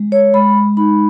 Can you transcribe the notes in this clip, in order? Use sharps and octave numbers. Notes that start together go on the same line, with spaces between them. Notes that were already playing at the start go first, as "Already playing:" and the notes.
Already playing: G#3
C#5
G#3 B5
D#4 B5